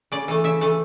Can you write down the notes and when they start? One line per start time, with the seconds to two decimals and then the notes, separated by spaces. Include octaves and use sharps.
0.12 C#3 D5
0.28 E3 A3
0.44 C#3 E5
0.61 E3 A3